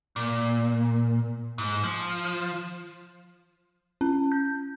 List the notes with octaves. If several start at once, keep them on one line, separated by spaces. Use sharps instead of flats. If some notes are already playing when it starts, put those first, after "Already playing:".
A#2
G#2
F3
C#4
G6